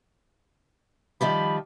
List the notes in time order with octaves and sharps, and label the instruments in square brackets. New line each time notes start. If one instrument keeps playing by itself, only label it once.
[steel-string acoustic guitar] D#3 F3 G3 [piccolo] B5